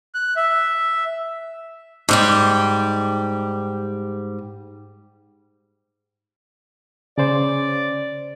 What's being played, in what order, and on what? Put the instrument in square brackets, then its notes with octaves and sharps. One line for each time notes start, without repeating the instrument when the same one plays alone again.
[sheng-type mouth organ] F#6
E5
[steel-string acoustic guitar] G#2 G3 G4
[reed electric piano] C#3 C5 [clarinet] D5